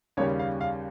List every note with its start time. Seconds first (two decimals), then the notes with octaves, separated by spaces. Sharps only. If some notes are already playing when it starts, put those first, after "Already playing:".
0.17 D#2 C#3 G3 C#4 C#5
0.39 F5
0.61 F5